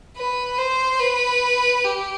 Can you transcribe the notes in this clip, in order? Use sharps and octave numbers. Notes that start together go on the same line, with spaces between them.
B4
C5
B4
G4